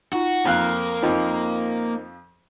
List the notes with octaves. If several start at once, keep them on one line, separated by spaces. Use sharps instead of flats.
D#4 F4 F#4
F2 A#3 F5 F#6
F2 F3 D#4 C5 D#5